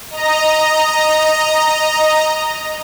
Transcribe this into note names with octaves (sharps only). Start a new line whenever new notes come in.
D#5 A#5